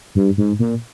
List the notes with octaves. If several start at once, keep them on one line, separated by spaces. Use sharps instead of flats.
G2
G#2
A#2